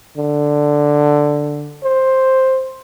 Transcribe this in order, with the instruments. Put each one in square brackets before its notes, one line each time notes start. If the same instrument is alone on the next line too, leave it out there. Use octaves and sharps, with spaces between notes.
[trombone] D3
C5